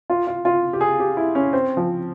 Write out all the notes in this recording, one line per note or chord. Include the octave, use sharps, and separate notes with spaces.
F4
F4
F4
G4
G#4
G4
E4
C#4
C4
F3